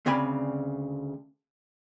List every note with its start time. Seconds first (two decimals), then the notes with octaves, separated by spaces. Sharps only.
0.06 D2 C#3 C4 D5 G#5 B5